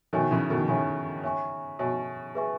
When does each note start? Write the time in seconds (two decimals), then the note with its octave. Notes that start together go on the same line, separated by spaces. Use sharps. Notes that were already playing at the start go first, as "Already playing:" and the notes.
0.13 B2 D#3 C#5 E5 G#5 C#6
0.31 C#3 E3
0.50 B2 D#3
0.68 C#3 C#5 E5 G#5 C#6
1.24 C#5 E5 G#5 C#6
1.79 B2 C#5 E5 G#5 C#6
2.35 G#4 B4 E5 G#5 C#6